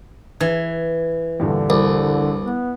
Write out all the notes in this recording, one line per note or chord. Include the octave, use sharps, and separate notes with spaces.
E3 G#6
E2 G2 A#2 D3
C2
B3